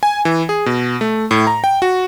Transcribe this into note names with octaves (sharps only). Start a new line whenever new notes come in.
G#5
E3
G#4
B2
A3
A2
A#5
G5
F#4